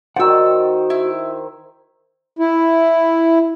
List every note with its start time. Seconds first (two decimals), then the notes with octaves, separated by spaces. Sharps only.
0.16 D#3 F#4 C5 D5 F#5 E6
0.90 E4
2.39 E4